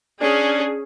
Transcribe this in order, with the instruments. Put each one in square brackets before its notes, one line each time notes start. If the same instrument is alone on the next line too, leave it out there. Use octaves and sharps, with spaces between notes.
[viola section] C#4 G#4 [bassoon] D4